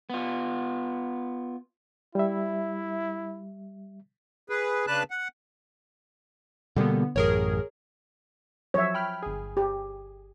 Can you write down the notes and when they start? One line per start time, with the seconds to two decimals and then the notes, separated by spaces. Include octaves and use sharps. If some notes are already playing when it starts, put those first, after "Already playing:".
0.10 B3 F4
2.15 G3 E4 E5
4.49 G#4 B4
4.87 C#3 D4 B4 A5 F#6
5.11 F#5
6.76 B2 D3 G3 A#3 B3
7.16 A1 F#2 G#4 A#4 C#5
8.74 F3 F#3 C#5 E5
8.94 G5 B5 F6
9.23 G1 G#4
9.57 G4